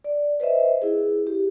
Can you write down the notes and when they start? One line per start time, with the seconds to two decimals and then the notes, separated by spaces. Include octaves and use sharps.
0.04 D5
0.40 B4 C5 D#5 E5
0.82 E4 G#4
1.27 G4